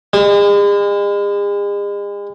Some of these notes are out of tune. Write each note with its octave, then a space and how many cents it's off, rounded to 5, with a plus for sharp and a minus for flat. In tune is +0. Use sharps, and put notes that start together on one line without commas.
G#3 -40